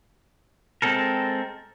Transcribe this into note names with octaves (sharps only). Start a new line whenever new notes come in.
G#3 C4 A4 A#4